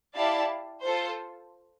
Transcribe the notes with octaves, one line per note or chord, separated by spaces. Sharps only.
E4 G4 D5 F5 A5
F4 A4 C5